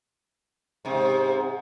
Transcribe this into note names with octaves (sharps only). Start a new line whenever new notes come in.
G#2 C3